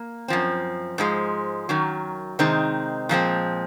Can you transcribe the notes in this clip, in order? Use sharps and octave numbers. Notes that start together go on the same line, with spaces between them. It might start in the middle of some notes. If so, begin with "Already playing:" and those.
Already playing: A#3
F#2 F3 C4
G#2 F3 G#3
F#2 D#3 F#3
C3 D#3 G#3 C4 D#4
A#2 F3 G#3 C4